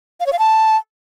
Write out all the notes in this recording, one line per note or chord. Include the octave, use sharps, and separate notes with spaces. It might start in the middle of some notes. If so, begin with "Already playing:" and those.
F5
C#5
F5
A5